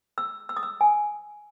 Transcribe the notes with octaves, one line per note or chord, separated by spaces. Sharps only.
E6
E6
D#6
E6
G#5